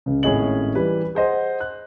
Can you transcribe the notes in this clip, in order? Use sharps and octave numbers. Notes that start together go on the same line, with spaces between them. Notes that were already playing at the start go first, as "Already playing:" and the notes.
C#2 C#3
G#1 A2 C#4 G#4 D#5 F#7
E3 G3 G4 B4
G#4 C5 D#5 F#5
F#6